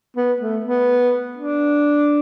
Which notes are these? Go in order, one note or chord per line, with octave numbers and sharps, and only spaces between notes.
B3
A3
B3
D4